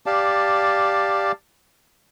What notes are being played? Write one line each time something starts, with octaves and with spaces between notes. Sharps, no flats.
G4 D5 F5 A5